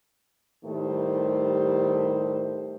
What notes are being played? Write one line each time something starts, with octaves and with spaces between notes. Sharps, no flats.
A2 D#3 G3 A3 G4 C5